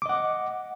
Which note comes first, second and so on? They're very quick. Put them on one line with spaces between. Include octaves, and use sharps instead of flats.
D6 D#5 F#5